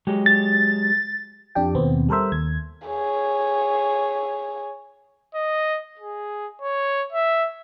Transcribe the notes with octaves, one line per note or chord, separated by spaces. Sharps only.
F#3 G#3 G4
A6
F2 D4 G4 G5
D#2 B2 B3 C4
G3 A4 A#4 C5 E5
D#2 G#6
G#4 C#5
D#5
G#4
C#5
E5